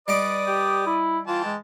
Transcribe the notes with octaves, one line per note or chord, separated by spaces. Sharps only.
G3 B4 D5 D#5 D6 D#6
G4
E4
E3 F4 G5 A5
G#3